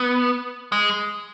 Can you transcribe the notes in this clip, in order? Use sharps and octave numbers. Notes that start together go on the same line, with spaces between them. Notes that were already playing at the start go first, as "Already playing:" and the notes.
Already playing: B3
G#3